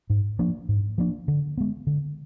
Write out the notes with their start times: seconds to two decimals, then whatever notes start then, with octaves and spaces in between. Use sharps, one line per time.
0.10 G#2
0.39 F3 A#3 D4
0.69 G#2
0.98 F3 A#3 D4
1.28 D3
1.58 G#3 B3
1.87 D3